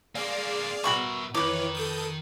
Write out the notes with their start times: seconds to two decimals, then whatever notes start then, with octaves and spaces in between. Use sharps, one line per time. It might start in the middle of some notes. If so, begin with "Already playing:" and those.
0.15 A#3 C4 G#4 D5 F5
0.84 B2 F#4 A#4 E5 B5 C#6
1.34 F2 D#3 E3 B4 C#5 D6
1.75 A4 D#6 G6